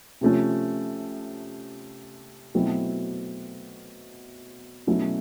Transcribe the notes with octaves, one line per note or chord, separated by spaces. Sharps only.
C3 F3 A3 C#4
B2 F#3 A3 C4 E4
B2 F#3 A3 C#4 E4